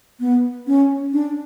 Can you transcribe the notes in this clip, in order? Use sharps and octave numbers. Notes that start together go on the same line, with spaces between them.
B3
C#4
D4